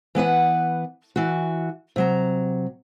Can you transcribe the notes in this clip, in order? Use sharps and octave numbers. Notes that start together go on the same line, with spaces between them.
E3 B3 B4 F#5
E3 F#4
C3 F#3 A#5